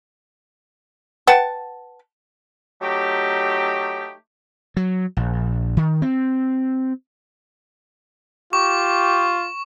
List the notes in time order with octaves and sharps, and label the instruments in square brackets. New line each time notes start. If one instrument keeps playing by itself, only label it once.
[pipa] B4 F#5 G5 A5
[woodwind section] F#3 A3 D#4 G4
[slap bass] F#3
A#1
D#3
C4
[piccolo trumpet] F4 [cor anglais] G4 [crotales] C#6